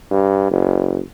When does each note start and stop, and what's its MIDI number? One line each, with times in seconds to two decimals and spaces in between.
0.11 0.49 43
0.51 1.01 30